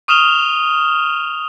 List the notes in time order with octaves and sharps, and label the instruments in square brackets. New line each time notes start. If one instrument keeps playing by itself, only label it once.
[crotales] C#6 D#6 F6 E7 F7 G7